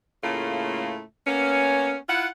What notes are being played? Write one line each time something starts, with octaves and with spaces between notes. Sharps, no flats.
A2 C#3 A3 A#3 F4
A#3 B3 C#4
E4 F4 F#5